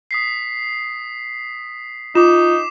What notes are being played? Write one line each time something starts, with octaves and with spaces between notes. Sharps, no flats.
D#6 B6 C7
D#4 F4 D6 E7